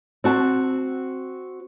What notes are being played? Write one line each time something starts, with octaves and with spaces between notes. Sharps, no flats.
C4 F#4 A5